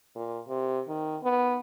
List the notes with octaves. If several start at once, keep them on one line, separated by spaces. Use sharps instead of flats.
A#2
C3
D#3
B3